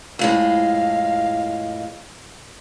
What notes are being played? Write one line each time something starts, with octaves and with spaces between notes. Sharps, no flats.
F2 A2 G#3 F5